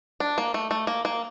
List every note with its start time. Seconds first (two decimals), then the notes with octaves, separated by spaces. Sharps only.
0.20 D4
0.38 A#3
0.54 A3
0.71 A3
0.87 A#3
1.05 A#3